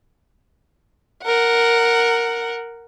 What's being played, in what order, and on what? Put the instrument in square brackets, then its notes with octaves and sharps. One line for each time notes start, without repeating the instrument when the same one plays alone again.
[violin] A#4 F#5